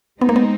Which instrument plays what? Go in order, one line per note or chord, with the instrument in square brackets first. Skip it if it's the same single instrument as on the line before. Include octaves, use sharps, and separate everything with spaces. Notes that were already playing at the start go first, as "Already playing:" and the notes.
[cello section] G#3 C4 D#4 [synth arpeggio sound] B3
[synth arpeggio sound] A#3
B3